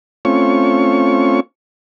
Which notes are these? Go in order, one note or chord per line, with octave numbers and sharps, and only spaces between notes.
A3 C4 C#4 F4 C#6